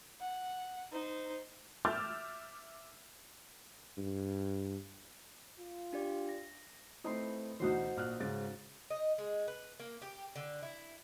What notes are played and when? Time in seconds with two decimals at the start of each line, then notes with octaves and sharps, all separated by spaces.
0.21 F#5
0.92 D#4 C5
1.85 E5 D6 E6 F6 G6 A6
3.97 G2
5.59 F4
5.93 D4 G4 D5
6.29 A#6
7.04 A3 C4 D#4 E4 B4 C6
7.60 D2 B2 E3 D#4 F#4 C5
7.97 A#1 F6 F#6
8.20 G#2 C#3 A6
8.91 D#5
9.18 G#3
9.48 B4
9.79 A#3
10.02 G4
10.36 D3
10.62 E4